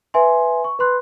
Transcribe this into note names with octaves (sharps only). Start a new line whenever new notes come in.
B4 E5 G#5 C6
C#6
B4 B5 C6 F#6